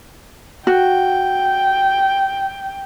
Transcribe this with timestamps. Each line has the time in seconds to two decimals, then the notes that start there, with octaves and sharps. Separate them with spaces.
0.67 F#4 G5